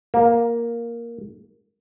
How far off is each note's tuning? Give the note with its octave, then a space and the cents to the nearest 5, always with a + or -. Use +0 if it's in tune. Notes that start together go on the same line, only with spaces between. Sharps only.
A#3 +5